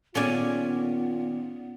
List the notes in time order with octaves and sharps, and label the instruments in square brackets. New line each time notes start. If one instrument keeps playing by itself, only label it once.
[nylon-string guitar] A#2 D#3 G#4 [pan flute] B3 [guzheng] C#4 D5 G#5 [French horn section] F4